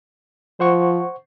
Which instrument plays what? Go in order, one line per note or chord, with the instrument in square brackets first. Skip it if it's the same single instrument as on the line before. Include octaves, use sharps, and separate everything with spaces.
[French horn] F3 [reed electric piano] C5 F#5 C#6